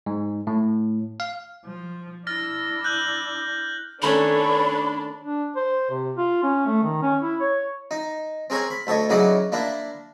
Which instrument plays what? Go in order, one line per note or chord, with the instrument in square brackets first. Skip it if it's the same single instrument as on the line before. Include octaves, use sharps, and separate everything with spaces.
[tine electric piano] G#2
A2
F5
[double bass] F3
[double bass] D4 E4 [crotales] F6 A6 A#6
[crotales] F#6 G6 F#7
[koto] D#3 A3 C#4 [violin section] D4 [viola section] A4 B4 C#5 [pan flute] B5
[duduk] D4
C5
C3
F4
C#4
A3
D#3
C#4
E4
C#5
[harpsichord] D#4
C4 G#4 A#4 C#5 G#5
B5
D2 A4 C#5 D#5
C#3 E3 F#3 D#4 D5 D#6
A#3 D4 E4